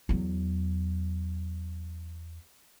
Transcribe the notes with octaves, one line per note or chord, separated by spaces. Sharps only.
E2 F#3